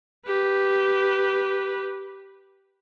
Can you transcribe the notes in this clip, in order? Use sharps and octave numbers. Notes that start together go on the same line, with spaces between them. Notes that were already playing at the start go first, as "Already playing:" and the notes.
G4 B4